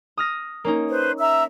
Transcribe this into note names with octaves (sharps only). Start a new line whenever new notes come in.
D#6 F6 A#6
A#3 C#4 D#4
B4 C5
E5 A#5 E6